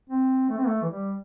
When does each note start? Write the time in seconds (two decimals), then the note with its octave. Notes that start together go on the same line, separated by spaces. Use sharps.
0.10 C4
0.49 A3
0.58 C4
0.67 A3
0.82 E3
0.89 G3